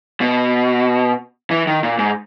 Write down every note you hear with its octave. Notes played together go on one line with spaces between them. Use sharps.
B2
E3
D#3
A#2
G#2